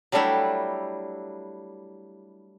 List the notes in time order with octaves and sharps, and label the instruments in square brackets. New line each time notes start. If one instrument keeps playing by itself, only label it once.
[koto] F#3 G3 A3 D4 E4 G4